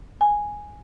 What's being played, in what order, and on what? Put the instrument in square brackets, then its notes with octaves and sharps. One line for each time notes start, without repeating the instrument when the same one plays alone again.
[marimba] G#5